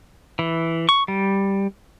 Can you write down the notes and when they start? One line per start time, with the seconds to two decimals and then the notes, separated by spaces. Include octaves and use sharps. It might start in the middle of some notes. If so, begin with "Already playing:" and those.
0.39 E3
0.89 C#6
1.08 G3